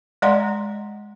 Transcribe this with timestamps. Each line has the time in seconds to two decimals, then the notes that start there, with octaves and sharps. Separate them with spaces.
0.22 G#3 D5 D#5 F#5 A#5 C6